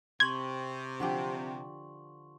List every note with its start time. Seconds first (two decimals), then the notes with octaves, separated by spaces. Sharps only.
0.20 C3 C6 C#6 G#6 F#7
1.00 D3 F3 G4